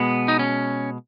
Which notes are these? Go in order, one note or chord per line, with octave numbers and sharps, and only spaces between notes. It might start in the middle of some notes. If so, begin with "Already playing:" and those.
Already playing: B2 G#3 B3
D#4
C#4